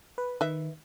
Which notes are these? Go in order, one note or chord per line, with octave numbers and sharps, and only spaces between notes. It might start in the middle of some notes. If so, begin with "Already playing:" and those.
B4
D#3 B4 D#5 E5